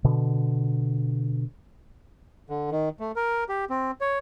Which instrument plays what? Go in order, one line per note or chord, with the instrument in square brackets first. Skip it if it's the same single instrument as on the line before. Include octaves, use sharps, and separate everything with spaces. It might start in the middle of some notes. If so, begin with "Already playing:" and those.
[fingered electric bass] B2 D3
[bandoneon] D3
D#3
A3
A#4
G4
C4
C#5